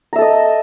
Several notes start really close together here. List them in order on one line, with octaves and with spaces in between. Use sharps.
A#5 E5 A4 D#5